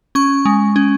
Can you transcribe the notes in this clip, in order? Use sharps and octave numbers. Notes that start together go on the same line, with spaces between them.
C#4 C#6
G#3
C#4